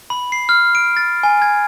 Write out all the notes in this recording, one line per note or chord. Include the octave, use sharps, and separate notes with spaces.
B5
C7
F6
D7
A6
G#5
G#6